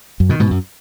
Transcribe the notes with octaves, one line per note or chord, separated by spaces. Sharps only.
F#2
B2 D#3
G#2 B2
F#2